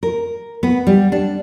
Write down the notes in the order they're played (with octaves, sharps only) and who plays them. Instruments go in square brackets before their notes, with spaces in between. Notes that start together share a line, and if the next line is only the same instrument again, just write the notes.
[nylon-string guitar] A#4
B3
G3
D4